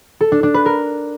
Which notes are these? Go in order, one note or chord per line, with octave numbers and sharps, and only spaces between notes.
A4
D4
D4
B4
A#4